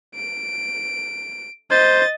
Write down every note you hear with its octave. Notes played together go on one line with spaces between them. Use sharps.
D7
C5 D#5 A6